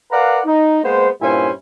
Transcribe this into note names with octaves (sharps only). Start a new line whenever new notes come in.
A#4 B4 D5 F5 F#5 A#5
D#4
G#3 A#3 B3 C5
G2 A#2 C#4 E4 C5 G#5